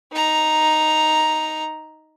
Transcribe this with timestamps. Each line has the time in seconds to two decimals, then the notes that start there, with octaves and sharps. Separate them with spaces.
0.13 D#4 A#5